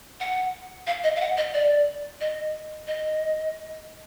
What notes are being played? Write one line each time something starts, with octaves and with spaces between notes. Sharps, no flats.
F#5
F5
D#5
F5
F#5
D#5
D5
D#5
D#5